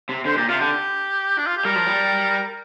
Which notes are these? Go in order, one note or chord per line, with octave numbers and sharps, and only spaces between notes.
C3
D3 C5
A#2 G4
C3 F4
D3 G4
D4
F4
G4
G3 A#4
F3
G3